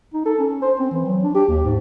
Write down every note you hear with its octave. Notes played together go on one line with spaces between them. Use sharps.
D#4
A4
C#4
C5
C4
E3
F#3
D4
G4
D#2
G#2